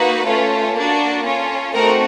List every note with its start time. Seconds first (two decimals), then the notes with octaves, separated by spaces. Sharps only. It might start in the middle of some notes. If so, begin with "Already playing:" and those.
Already playing: A#3 D#4 F#4 B4
0.26 A3 C#4 F4 A4
0.75 A#3 D4 F#4
1.25 C#4 F4 A4
1.74 A3 C4 D#4 F#4 A#4